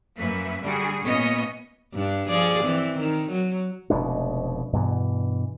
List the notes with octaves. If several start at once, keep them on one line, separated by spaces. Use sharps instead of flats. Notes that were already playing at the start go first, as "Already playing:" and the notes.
F#2 A#3 B4 E5
D3 G3 F#4 G#4
A#2 B3 C#4 C#5 D#5
G2 D4
F3 G#4 D5
E3 C4
D#3
F#3
F1 B2 G#3 D4
G2 B2 E3